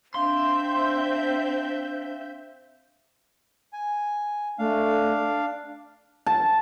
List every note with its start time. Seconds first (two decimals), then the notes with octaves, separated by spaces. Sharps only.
0.15 C4 D4 E5 F5 C6 G6
3.73 G#5
4.59 A3 D4 F5
6.26 A5